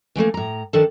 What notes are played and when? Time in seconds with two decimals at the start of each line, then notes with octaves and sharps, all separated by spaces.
0.15 E3 F#3 A3 A#3
0.34 A2 A#5
0.73 D#3 D4 A4